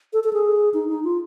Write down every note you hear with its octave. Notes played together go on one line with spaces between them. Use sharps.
A4
A4
G#4
D#4
D#4
F4